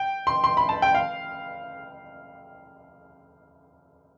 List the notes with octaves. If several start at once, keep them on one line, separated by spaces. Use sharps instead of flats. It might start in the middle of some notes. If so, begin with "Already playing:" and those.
Already playing: G5
C6
C6
B5
A5
G5
F5